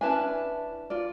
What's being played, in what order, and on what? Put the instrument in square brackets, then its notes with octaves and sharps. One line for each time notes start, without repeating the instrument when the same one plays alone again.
[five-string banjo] C#4 B4 G#5 [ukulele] D4 E4 A5
[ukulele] F4 D5